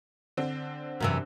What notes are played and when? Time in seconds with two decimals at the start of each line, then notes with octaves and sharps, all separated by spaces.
0.37 D3 C4 D4
1.00 F#2 C3 E3